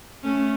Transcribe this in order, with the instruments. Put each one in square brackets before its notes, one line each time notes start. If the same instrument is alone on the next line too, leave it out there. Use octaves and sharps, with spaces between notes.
[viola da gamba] A3 C#4